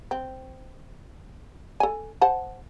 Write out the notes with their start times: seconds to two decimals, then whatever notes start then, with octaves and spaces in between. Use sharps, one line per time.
0.11 C4
1.80 A4 G#5
2.21 C5 F#5 A5